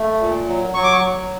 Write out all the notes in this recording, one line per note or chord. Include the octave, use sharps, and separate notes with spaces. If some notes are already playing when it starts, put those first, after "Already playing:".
Already playing: A3
A#2
F#3
F#3 C#6
D6
C#6
F#3